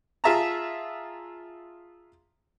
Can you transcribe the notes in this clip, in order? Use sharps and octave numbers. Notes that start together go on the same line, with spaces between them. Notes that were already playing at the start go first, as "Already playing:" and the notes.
F4 G#4 E5 A5 A#5